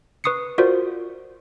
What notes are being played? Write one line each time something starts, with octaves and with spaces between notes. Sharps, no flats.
B4 C#6 D#6 C7 C#7
F4 F#4 A#4 C5 D5